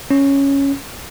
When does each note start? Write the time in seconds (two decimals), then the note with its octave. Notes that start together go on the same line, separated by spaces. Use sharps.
0.11 C#4